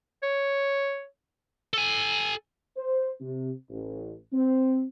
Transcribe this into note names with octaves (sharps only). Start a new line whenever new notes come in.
C#5
A4 G#5
C5
C3
A1
C4